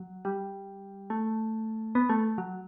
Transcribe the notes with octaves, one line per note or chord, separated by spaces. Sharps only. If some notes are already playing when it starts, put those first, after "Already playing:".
Already playing: F#3
G3
A3
B3
A3
F#3